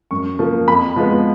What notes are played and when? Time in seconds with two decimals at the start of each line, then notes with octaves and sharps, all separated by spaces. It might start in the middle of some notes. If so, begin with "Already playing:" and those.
0.11 F#2 C#6
0.39 F3 A#3
0.67 F2 B5
0.96 F3 G#3 B3